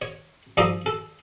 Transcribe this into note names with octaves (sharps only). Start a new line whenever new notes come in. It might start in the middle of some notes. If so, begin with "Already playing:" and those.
C#5
G2 F3 A4 D5 A#5 D#6
A4